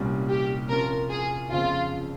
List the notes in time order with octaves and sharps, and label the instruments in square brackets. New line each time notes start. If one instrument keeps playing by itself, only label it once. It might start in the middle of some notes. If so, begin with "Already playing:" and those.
Already playing: [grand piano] C2 A#2 G3 C#4
[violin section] G4
[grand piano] C3 F3 A#3 C#4 F4 [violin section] A#4
[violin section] G#4
[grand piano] G1 F2 C#3 F3 [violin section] F4